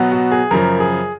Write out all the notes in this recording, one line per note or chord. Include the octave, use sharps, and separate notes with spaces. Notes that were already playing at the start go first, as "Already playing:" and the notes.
Already playing: B2 F#3 B3
F#4
G#4
F#2 C#3 F3 A#4
G#4